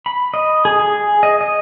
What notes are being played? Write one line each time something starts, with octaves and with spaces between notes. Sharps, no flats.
B5
D#5
G#4
G#4
D#5
D#5